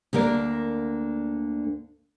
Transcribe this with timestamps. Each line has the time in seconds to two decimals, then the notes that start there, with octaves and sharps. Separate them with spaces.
0.13 D2 D3 A#3 A#4 D5